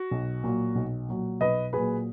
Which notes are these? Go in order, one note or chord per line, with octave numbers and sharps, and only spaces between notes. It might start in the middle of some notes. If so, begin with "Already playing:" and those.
Already playing: F#4
B1
A#2 F#3
B1
A#2 F#3
B1 B4 D#5
A#2 F#3 G#4 B4